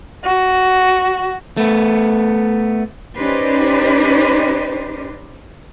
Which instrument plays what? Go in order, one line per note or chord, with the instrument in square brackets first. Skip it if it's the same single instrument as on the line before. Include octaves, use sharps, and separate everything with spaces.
[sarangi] F#4
[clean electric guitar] A3 B3
[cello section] C#4 D#4 G4 B4 C5 D5